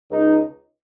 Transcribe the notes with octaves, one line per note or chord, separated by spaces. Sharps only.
C#2 D#4